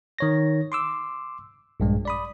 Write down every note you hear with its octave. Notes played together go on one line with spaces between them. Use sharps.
D#3 C#5 A#6
C6 D6 E6
A#1 G2 G#3
D5 B5 D#6